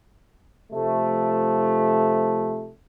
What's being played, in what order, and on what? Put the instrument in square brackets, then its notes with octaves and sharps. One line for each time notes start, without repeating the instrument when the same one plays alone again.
[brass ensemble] C3 F3 A3